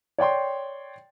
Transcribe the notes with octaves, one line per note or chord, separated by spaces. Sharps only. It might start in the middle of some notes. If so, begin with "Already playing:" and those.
C#5 D5 G5 C6